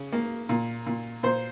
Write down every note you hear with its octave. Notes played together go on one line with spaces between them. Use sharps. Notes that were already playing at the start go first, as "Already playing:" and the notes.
Already playing: C#3
A#3
A#2
A#2
A#2 C5